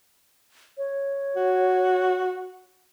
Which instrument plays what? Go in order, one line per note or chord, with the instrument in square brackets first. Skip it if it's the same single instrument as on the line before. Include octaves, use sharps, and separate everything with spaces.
[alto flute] C#5
[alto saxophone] F#4